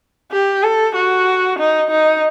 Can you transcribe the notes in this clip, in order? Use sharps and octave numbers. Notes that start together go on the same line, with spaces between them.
G4
A4
F#4
D#4
D#4